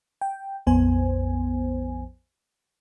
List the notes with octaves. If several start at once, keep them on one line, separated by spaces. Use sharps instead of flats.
G5
A#1 F2 B3 C5 G#5